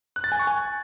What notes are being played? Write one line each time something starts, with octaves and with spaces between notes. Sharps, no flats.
F#6
A6
G#5
C#6
G#5